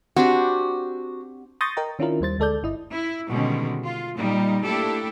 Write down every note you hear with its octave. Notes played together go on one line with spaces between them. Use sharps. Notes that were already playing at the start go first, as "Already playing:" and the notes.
C4 D4 F#4 G4
C6 C#6 D#6 G6 A6 A#6
A#4 D#5 G5 A#5
D#3 C#4 D4 E4 F4 A#4
D#2 G3 C5 A6
D2 G#3 A4 D5 G6
G1 E4 D#5
E4
B2 D3 D#3 G3 G#3 C#4
F4
A#2 G3 D#4
A3 A#3 D4 E4 G4 A4